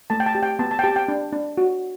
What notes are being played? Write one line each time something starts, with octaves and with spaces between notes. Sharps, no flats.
A3 A5
G5
A5
G4
G5
B3 A5
A5
G5
G4 A5
G5
D4
D4
F#4